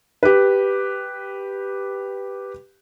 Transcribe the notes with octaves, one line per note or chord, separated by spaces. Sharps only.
G4 B4